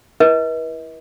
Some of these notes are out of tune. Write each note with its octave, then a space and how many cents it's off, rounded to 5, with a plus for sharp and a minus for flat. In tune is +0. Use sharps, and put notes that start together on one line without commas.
E4 +0 B4 -40 D#5 +45